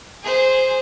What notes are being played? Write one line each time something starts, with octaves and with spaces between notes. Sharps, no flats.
G#4 C5